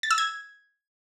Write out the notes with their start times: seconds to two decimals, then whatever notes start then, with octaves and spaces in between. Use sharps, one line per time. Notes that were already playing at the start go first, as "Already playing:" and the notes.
0.03 A6
0.11 E6
0.18 G#6